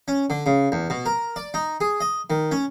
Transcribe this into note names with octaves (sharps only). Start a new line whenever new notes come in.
C#4
D3
C#3
E2
B2
A#4
D5
D#4
G#4
D#5
D#3
C#4